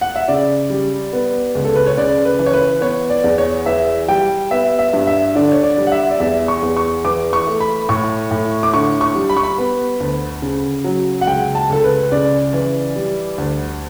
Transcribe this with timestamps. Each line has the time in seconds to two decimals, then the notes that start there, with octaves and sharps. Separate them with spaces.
0.01 F#5
0.16 E5
0.28 C#3 D5
0.70 G3
1.13 B3
1.55 C#2
1.65 A4
1.76 B4
1.87 C#5
1.97 C#3 D5
2.25 B4
2.39 E3
2.46 C#5
2.54 B4
2.81 B3 C#5
3.10 D5
3.24 E2
3.38 C#5
3.66 E3 E5
4.08 G3 G5
4.51 B3 E5
4.79 E5
4.93 G2
5.07 E5
5.35 D3 D5
5.52 C#5
5.63 D5
5.77 G3
5.87 F#5
5.92 E5
6.10 D5
6.20 E2 E5
6.48 C#6
6.62 E2
6.77 C#6
7.05 E3 D6
7.33 C#6
7.47 A3
7.60 B5
7.89 A2 C#6
8.31 A2
8.63 D6
8.74 D3 C#6
9.01 C#6
9.15 G3
9.30 B5
9.37 C#6
9.43 B5
9.58 B3
10.00 D2
10.42 C#3
10.84 F#3
11.21 F#5
11.27 C#2 G5
11.55 A5
11.69 C#2 A4
11.84 B4
12.12 C#3 D5
12.53 E3
12.96 G3
13.38 D2